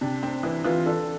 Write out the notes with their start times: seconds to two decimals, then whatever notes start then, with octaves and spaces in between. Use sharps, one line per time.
0.01 C3 D4
0.23 C4
0.43 E3 E4
0.64 E3 F4
0.86 D4 A4